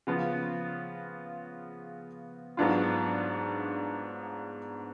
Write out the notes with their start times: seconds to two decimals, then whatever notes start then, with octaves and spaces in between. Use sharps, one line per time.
0.07 C#3 F3 B3 F4
2.57 G#2 F#3 B3 D4 F4